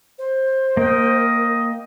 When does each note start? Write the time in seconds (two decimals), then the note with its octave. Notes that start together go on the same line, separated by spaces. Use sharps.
0.18 C5
0.77 A#3 A#4 D#5 G5